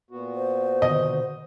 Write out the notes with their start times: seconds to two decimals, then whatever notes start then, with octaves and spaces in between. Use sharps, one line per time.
0.10 A#2 B3 F#4
0.35 C5
0.82 B2 D3 D#3 D#5